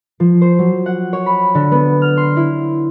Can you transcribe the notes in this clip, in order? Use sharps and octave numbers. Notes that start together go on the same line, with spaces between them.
F3
C5
F#3
F#5
C#5
B5
D3
B3
F6
C6
E4